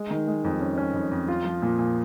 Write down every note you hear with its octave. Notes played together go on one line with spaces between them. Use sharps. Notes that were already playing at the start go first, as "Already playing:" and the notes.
Already playing: G#3
D#3
G#3
F2
C#4
C#4
F2
F2
F4
F3
A#2
A#2